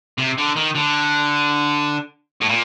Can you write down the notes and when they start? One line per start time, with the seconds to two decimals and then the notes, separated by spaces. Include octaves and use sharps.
0.18 C3
0.38 D3
0.56 D#3
0.76 D3
2.41 A2
2.49 A#2